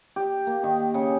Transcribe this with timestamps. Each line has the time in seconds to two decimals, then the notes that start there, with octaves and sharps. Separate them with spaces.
0.16 G4
0.47 A#3
0.63 D#3
0.94 C#3